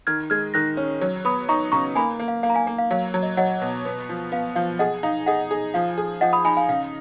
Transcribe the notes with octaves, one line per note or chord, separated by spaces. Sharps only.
D#3 F6 G#6
G#3 F6 G#6
D#3 F#6 A#6
C#4
F#3
B3 B5 D#6
D#4 A#5 C#6
C#3 A#5 C#6
A#3 G#5 B5
A#3
F5
A#3 F5
A#5
F5 G#5
A#3
F5
F#3 F5
F#3
D#5
F#3 D#5 F#5
B2
B3
F3
B3 F5
F3 F5
G#4 D#5 F#5
D#4 F5
G#4 D#5 F#5
G#4
F3 F5
G#4
F3 D#5 F#5
B5 D#6
D#4 G#5 B5
F5 G#5
C#3 F5